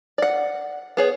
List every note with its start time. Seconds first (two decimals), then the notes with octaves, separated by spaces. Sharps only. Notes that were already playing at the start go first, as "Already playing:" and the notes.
0.18 D5 F#5
0.97 B3 G#4 C#5